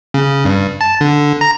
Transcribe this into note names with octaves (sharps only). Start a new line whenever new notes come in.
C#3
G2
A5
D3
A#5